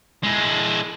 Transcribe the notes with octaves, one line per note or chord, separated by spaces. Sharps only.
G#3 E4